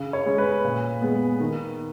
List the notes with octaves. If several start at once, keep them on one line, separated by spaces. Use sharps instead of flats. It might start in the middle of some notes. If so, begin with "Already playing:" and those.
Already playing: C#3
C#5
G#3 C#4
B4
A#2
G#3 B3
D#3